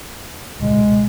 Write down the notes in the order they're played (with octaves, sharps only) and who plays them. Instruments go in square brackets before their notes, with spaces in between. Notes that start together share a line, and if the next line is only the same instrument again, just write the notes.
[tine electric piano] C#2 A#2 C#3 [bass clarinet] G#3
[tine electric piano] B2